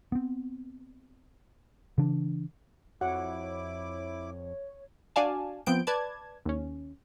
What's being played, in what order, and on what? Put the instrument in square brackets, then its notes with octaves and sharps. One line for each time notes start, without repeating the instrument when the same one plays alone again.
[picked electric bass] B3 C4
C#3 E3 D4
[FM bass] F2 [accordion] E4 D6 [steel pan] F#4 F#5 [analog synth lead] C#5
[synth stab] D4 F#4 D5 F5 G#5 A5
F3 B3 C4 G6 D7
B4 D5 A5 G#6
D#2 C#4